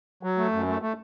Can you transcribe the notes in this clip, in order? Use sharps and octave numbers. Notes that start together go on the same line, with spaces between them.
F#3
A3
F#2
A3
A3